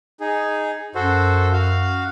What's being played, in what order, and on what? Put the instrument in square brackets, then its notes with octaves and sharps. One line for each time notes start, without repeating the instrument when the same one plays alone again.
[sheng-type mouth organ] D#4 G#4
[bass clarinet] F#2 [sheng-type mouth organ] F#4 A4 C5
[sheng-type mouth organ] F#4 F5